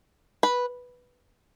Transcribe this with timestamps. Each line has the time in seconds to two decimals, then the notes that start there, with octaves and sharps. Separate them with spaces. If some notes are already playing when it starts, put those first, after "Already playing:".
0.43 B4